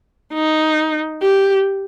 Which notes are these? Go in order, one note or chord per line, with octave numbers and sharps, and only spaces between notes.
D#4
G4